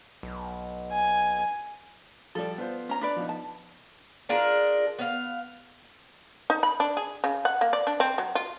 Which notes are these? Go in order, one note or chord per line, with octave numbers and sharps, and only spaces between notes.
B1
G#5
F3 G3 A4 D5
B3 F4 C5
C#4 A#5
D4 B4 D5
F3 B3 D#4
A5
D4 F4 G#4 A#4
B3 F5
D#4
B5
D4
G#4
C#3
F#5
A#3
D5
D4
C4
F#3
F4